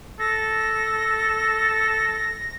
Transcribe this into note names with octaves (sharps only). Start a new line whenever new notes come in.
A4 A#6